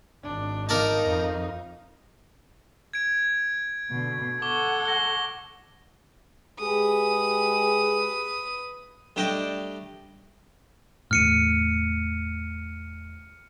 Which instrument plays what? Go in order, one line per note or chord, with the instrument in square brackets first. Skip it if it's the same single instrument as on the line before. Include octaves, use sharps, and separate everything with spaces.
[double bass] G#1 [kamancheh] D4
[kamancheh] D#4 F5 [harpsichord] A#4 D5 A5
[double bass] F2
[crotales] G#6 D7
[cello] B2 D3
[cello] A4 F#5 [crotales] C#6 D6 G7
[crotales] A#6 G7
[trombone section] G#3 G4 G#4 [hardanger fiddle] B4 D#6
[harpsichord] G3 A3 D4 D#5 G5
[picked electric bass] E1 A2 [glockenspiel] F6 C#7 D#7